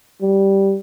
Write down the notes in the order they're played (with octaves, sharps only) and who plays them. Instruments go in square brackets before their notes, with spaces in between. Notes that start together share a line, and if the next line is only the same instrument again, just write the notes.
[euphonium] G3